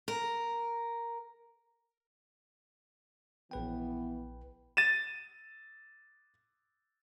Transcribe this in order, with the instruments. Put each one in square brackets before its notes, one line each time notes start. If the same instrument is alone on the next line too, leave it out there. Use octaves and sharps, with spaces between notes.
[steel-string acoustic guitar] A#4
[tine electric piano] A#1 B4 G5 [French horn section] E3 B3
[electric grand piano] A6 D#7 E7